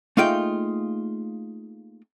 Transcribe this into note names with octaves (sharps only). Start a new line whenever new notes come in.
A3 A#3 D#4 F4 G#4 G5